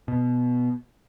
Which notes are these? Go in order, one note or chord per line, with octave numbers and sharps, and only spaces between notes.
B2